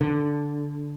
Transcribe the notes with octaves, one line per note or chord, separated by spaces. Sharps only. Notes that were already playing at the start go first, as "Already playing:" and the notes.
D3